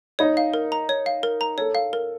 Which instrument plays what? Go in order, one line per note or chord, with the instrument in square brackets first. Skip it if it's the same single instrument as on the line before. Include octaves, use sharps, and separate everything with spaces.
[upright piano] D#4 [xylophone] C#5
[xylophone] F5
A#4
A#5
C#5
F5
A#4
A#5
[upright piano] A4 [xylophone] C#5
[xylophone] F5
A#4